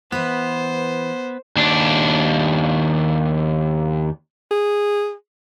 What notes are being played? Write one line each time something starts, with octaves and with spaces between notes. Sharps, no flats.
E3 B3 B4 C5
D#2 D4
G#4